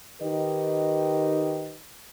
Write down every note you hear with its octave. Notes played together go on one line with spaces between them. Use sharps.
D#3 D#4 G4 B4 D#5